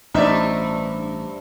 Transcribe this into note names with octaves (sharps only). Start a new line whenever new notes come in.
A1 G2 C4 D#4 D5 E5